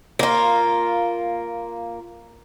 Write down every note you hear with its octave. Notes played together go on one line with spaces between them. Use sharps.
A#3 F4